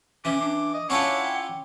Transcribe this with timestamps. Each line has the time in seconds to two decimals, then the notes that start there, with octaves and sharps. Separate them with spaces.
0.25 E3 C#4 D6
0.41 D4 D6
0.74 D#5
0.90 C#4 D4 E4 F4 C#5 F#5 D6
1.25 G5